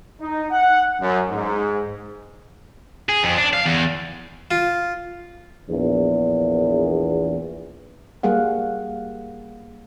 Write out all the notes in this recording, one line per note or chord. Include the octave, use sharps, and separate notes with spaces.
D#4
F#5
F#2
G#2
G#4
F2
D4
F5
E2
F4
A#1 E2
G3 A#3 G#4 F5 F#5